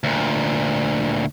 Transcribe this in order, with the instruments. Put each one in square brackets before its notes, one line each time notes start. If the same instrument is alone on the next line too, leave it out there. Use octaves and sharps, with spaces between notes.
[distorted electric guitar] D2 A#2